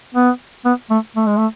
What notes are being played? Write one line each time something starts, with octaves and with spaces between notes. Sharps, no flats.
B3
B3
A3
A3
G#3
A3